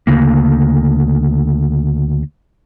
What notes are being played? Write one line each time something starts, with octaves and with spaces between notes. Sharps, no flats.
D2 C#3 A#3